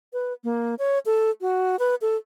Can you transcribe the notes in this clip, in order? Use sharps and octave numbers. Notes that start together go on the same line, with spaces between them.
B4
A#3
C#5
A4
F#4
B4
A4